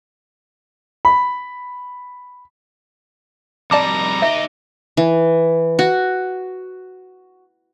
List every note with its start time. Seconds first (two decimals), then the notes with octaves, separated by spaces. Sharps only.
1.05 B5
3.71 F2 G3 D5 A5 A#5 D6
4.22 D#4 G4 E5
4.97 E3
5.79 F#4